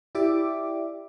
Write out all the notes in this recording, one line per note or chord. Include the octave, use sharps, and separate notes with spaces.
E4 G4 D5 E5 D6